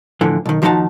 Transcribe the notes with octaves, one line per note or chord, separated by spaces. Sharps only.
A2 D3 E3 F3
B1 D#3
D#2 F3 G#3 D#4 F#4 A5